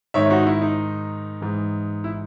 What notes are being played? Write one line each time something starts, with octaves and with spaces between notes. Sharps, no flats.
G#2 D#3 C#5 E5
D#4 F#4
E4
D#4
G#2 E3
E4